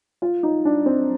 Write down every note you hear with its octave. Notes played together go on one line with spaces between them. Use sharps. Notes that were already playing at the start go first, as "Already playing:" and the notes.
F4
D#4
D4
C4